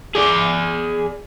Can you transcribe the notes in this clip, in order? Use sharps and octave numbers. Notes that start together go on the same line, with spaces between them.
G#4 D5